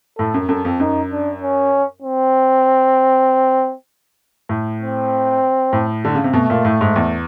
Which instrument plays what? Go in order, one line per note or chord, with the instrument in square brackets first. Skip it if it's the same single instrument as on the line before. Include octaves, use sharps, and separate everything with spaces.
[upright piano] A2 [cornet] A4
[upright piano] F#2
[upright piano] F#2 [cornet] A4
[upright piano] F2
[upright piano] F#2 [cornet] D#4
[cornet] D4
C#4
C4
[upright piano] A2
[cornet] C4
[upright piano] A2
D3
C#3
C3
[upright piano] B2 [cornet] A3
[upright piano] A#2
A2
G#2
E2